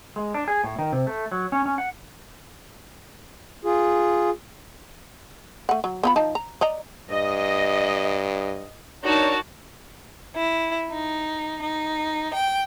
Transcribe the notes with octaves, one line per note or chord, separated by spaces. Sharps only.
G#3
D4
G#4
A2
D#3
C3
A3
F#3
C#4
C#4
F#5
F4 G#4
A3 F#5
F#3
B3 F4 B5
F3 D#4 A5
A#5
D5 D#5 A#5
G2 D#5
D4 D#4 F#4 A#4 C#5 A5
E4
D#4
D#4
G5